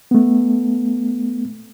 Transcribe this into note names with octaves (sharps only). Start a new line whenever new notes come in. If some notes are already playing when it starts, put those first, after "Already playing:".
A3 B3